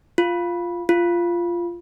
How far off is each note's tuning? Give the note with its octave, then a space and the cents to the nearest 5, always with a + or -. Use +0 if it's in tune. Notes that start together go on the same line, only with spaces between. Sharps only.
F4 +0
F4 -10